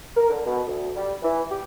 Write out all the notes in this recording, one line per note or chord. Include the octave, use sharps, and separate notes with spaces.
A#4
D3
B2
D2
G3
E3
G4